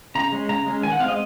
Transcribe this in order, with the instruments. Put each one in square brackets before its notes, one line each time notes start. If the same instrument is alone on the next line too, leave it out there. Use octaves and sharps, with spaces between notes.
[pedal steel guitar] C#3 A#5
G#3 C#4
C#3 A#5
G#3 C#4
D#3 G#5
F#5
C4 F5
G#3 D#5